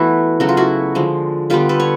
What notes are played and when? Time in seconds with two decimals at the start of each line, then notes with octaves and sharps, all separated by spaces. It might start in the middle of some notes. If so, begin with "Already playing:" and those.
Already playing: E3 A3 B3 E4 F#4
0.40 C#3 F#3 A3 F#4
0.49 F4
0.57 E4 F#4
0.95 D3 F3 G#3
1.50 D3 G3 B3 F4 G4
1.69 A4 B4
1.80 C#5